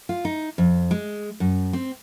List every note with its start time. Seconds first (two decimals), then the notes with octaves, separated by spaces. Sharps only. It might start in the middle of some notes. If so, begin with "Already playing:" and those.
0.09 F4
0.25 D#4
0.58 F2
0.91 G#3
1.40 F#2
1.73 C4